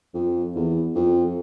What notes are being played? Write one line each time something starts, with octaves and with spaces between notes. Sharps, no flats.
F2
E2
F2